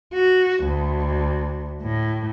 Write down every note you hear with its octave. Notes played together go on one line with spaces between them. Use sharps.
F#4
D2
A2